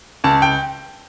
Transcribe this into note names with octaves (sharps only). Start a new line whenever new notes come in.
C#2 A5
G5